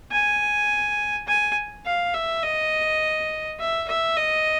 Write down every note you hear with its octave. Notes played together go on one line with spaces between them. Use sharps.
G#5
G#5
F5
E5
D#5
E5
E5
D#5